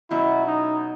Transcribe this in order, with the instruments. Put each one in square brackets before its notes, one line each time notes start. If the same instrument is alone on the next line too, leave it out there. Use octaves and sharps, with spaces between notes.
[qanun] B2 F#3 C#4 [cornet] E4
[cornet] D#4